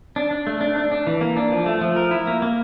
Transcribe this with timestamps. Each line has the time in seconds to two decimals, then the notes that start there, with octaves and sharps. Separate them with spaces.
0.16 D4
0.31 D4
0.47 A3
0.61 D4
0.76 D4
0.92 D4
1.07 E3
1.21 A#3
1.37 D4
1.52 F3
1.66 A3
1.81 F3
1.96 A#4
2.11 E4
2.27 A#3
2.42 A#3